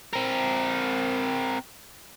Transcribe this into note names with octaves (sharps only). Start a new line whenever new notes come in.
C4 A#4